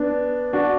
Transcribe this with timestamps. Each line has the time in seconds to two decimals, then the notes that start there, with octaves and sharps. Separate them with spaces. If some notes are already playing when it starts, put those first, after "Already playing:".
Already playing: B3 D4
0.53 D4 F#4